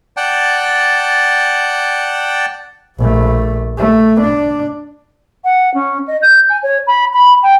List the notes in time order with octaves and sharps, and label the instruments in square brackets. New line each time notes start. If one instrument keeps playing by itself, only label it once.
[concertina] D5 F#5 G5 A5
[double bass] A#1 A3
A3
D4
[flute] F#5
C#4
D#5
G6
G#5
C#5
B5
B5
G5